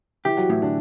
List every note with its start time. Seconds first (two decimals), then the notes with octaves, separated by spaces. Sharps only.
0.25 E3 E4 G4
0.37 F#3 F#4
0.49 A2 E3 E4
0.62 D3 D4